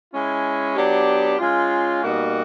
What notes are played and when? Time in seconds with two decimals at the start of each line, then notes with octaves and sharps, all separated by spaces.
0.12 G#3 C#4 E4
0.75 F#3 B3 D4 G4
1.39 G#3 C#4 F4
2.02 B2 G3 A#3 D#4 F#4